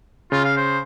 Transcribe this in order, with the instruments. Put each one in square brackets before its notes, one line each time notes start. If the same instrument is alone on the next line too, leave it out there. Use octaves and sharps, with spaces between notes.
[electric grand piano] C#3 [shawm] F4
[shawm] F5
C5